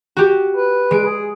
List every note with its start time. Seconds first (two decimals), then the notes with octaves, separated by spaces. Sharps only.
0.16 F#4 G4
0.57 B4
0.91 G#3 D7
1.06 G#4